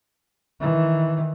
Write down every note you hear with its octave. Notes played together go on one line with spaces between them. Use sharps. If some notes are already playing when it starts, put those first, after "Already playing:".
D#3 E3